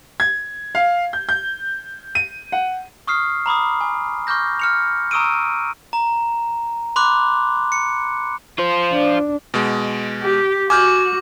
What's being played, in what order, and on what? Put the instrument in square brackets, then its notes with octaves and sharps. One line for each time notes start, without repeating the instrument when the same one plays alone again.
[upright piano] G#6
F5
G6
G6
D#7
F#5
[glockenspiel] C#6 D#6 F6 C7
A#5 B5 D6 D#6
G#5
C#6 D6 F6 G6 A#6
F6 C#7 F7
A#5 C#6 D#6 E6 D7 D#7
A#5
B5 C6 D6 F#6
C#7
[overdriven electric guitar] F4 C5
[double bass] D4
[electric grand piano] B2 G#3
[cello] G4
[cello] F#4 [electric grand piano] G#5 F6 G6 [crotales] D6